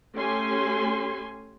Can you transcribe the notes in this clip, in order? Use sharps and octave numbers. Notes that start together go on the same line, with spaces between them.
A3 C#4 G4 G#5 C6